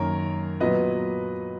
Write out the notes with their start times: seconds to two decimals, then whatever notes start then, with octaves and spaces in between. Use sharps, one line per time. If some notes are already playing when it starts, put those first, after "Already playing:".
Already playing: F#2 D#3 A#3 A#4 C#5
0.60 A#2 F#3 B3 B4 D#5